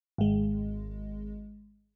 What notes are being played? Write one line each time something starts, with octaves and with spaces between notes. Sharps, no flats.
G#1 G#3